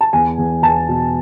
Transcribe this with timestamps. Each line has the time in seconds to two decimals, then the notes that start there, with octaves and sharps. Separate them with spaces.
0.01 A5
0.13 E2 G#5
0.38 E2
0.62 E2 A5
0.88 B2